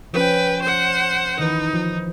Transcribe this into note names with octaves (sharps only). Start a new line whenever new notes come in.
F3 C#4 B4 G5
C5 F#5
D#3 E3 D#4 B4
F3